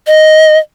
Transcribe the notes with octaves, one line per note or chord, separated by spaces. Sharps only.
D#5